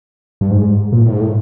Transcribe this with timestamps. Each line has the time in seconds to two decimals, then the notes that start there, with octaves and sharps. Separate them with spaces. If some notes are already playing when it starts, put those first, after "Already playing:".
0.41 G2
0.51 G#2
0.92 A#2
1.01 A2
1.11 G#2
1.21 A2